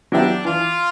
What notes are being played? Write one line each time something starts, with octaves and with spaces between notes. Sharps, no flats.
F#3 B3 D4 E4 G4
E3 F4